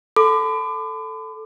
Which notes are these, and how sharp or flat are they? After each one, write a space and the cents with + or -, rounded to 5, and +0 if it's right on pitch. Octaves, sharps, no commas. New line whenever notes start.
A4 +0 B5 +40 D6 +25